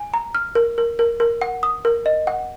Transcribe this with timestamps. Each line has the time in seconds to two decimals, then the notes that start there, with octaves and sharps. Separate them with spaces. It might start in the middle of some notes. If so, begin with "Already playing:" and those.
Already playing: G#5
0.14 A#5
0.35 F6
0.55 A#4
0.78 A#4
0.99 A#4
1.20 A#4
1.41 F#5
1.63 D#6
1.85 A#4
2.06 D#5
2.27 F#5